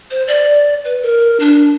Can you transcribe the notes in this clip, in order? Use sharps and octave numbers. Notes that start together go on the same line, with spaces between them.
C5
D5
B4
A#4
D4